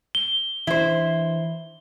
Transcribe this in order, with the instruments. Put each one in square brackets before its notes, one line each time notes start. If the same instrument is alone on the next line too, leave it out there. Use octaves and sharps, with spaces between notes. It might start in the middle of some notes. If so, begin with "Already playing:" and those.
[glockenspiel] G7
[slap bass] E3 C#4 D4 [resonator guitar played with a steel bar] E4 C5